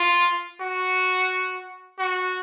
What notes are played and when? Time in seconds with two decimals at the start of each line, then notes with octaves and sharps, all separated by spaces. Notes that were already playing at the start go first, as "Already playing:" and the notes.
Already playing: F4
0.61 F#4
1.99 F#4